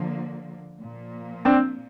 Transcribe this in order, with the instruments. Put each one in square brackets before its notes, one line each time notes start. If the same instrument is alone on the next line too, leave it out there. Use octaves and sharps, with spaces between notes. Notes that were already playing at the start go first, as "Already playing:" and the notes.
Already playing: [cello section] D3 F3 A#3
A#2 F3 A#3
[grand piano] C4 D4